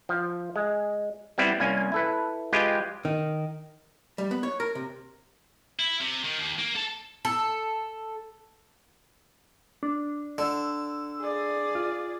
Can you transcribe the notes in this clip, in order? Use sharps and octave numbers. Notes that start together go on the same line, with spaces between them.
F3
G#3
G3 B3 C4 E4
C2 A#3 C#4 G#5
E4 A4 B4
G#3 F4 G4 B4 G5 G#5
D#3
G3
B3
C#5
A#4
C3
E4
C3
D#3
D#2
A#3
A4 A5
A4
D4
D3 E6
G#4 D5
F4